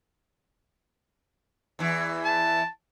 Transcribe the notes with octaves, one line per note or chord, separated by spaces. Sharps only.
E2 E3
A5